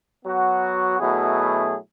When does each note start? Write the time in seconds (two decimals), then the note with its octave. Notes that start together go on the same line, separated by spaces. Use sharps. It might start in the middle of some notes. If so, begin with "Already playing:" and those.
0.24 F#3 B3 F#4
1.00 B2 F#3 A3 E4 G#4